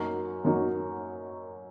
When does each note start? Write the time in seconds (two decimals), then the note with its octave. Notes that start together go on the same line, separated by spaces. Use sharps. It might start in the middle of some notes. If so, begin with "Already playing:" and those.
Already playing: F#2 F#3 A#3 D#4 F#4
0.45 F#2 F#3 A#3 D#4 F#4